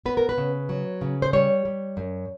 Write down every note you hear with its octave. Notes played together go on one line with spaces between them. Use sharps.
B3 B4
A#4
B4
C#3
F#3
C#3
C5
G3 C#5
G3
F#2